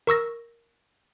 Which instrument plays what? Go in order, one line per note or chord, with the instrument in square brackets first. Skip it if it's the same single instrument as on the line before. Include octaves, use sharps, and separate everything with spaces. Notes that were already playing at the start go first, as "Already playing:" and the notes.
[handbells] A#4 C#6 E6 A#6